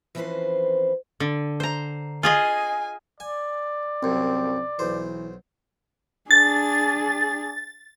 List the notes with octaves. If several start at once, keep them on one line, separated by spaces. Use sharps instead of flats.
E3 F3 C4 C#4 B4 C5
D3
C5 A#5
F4 G#4 D#5 G#5
D5 G#5
C2 F#2 C4
B1 E3 C5
D4 G#4 A6